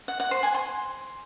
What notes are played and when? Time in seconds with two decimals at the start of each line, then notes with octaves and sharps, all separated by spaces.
0.08 F#5
0.20 F#5
0.31 C5
0.43 G#5
0.54 C6